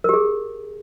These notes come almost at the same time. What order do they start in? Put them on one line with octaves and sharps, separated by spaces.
A#4 G4 G#4